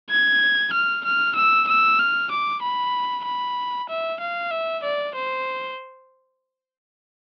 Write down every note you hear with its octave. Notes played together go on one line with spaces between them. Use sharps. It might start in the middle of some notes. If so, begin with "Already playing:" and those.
G#6
F6
F6
E6
E6
F6
D6
B5
B5
E5
F5
E5
D5
C5